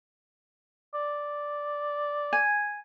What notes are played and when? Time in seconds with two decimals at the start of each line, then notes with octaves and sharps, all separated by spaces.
0.94 D5
2.33 G#5